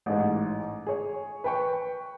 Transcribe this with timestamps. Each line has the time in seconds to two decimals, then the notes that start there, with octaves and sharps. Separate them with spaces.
0.06 A1 G#2
0.87 G#4 C#5
1.44 B4 G5 C#6